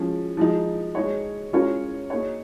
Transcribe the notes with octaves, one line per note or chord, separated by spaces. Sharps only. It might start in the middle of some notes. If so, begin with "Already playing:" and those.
Already playing: F3 G#3 C#4
F3 G#3 D#4
G#3 D#4 C#5
G#3 C#4 F4 A#4 C#5
A#3 D#4 G#4 C#5